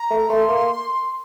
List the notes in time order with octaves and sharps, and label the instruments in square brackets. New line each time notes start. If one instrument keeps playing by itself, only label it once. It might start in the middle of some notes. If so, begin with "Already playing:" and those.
Already playing: [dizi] A#5
[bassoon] A3
[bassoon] A3 [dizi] C6
[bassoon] A#3